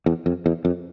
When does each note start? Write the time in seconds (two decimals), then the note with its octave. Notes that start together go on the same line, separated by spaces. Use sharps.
0.06 E2
0.26 F2
0.46 E2
0.65 F2